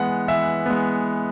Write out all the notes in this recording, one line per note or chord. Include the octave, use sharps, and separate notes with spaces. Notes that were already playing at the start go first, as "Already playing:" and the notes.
Already playing: E3 G#3 B3 F#5
E3 E5
G#3 B3